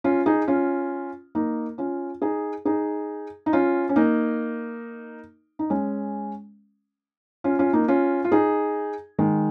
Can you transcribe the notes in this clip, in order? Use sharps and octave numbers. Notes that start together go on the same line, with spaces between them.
C#4 F4
D#4 G#4
C#4 F4
A#3 D#4
C#4 F4
D#4 G#4
D#4 G#4
D#4
C#4 F4
C#4
A#3 D#4
D#4
G#3 C#4
C#4 F4
C#4 F4
A#3 D#4
C#4 F4
F4
D#4 G#4
D#3 G#3